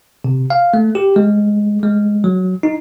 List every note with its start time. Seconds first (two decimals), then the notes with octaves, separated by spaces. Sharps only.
0.24 C3
0.50 F5
0.74 A3
0.95 G4
1.16 G#3
1.83 G#3
2.24 F#3
2.63 D#4